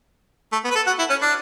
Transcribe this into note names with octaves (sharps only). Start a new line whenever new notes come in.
A3
B3
B4
A4
F#4
E4
C#4
D4